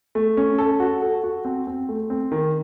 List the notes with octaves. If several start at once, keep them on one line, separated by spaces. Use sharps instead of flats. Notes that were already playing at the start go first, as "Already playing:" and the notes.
A3
C#4
A4
F#4
A4
F#4
C4
C4
A3
C4
D#3